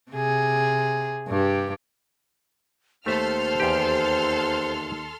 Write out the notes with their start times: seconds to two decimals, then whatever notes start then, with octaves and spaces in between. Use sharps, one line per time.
0.12 C3 G#4
1.28 G2 G4
3.06 D#2 A3 A4 C5 E5 C6 F6
3.60 E2 G4